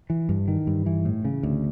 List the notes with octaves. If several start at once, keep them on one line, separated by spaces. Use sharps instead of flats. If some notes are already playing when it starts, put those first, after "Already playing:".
E3
G2
D#3
G2
E3
A2
C#3
D2